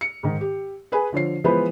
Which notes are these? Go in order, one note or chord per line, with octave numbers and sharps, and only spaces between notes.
C#7
G#2 D#3
G4
G#4 B4 G#5
D3 F3 C#5 C7
E3 F3 G#3 B3 B4 C5